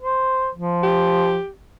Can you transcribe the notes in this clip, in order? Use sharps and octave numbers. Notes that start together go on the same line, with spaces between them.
C5
F3
G4